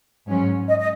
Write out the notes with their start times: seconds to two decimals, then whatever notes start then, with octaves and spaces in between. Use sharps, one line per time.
0.29 G#2 F#3 C#4
0.68 D#5
0.80 D#5